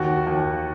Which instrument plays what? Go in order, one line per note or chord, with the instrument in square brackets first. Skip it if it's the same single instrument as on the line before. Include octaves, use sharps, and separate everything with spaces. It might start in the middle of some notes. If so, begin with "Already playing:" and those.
Already playing: [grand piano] D#2 F#4
D#2